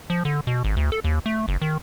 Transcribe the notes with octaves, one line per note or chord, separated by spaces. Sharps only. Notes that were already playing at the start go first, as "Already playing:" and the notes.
F3
D3
B2
G#1
D2
A4
D#2
A3
F#1
D#3